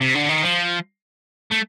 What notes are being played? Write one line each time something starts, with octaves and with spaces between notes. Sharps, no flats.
C3
D3
D#3
F3
A3